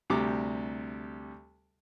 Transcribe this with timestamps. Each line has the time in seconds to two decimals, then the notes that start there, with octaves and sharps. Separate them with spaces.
0.10 D2 C3 G3 A#5 D6